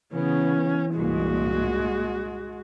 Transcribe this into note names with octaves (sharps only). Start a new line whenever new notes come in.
C#3 E3 B3 C#4
C2 G2 A#2 G#3 F#4